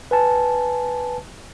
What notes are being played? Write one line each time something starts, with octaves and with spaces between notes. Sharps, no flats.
B4 G#5 A5